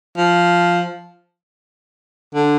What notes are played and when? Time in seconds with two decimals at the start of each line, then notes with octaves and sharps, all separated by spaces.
0.17 F3
2.35 D3